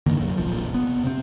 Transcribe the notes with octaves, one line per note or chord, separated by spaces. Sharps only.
G2 D3 D#3 A#3
C2 F#2
D1 A#1 F2 F3
F1 B3
C3 C4